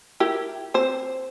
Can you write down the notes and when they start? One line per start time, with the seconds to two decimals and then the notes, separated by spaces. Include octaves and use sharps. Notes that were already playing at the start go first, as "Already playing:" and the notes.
0.20 E4 G4 A#4
0.74 C4 C5